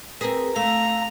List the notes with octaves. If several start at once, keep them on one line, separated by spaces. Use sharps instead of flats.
C4 G#4 A#4 B4 A#5
A3 F5 A#5